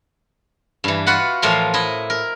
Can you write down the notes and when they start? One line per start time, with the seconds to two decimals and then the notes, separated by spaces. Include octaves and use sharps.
0.84 G2 E3
1.06 F4 F#4 B4 F#5
1.42 A2 E3 F3 A#4 F5 C6
1.74 E4 D#5
2.10 A#4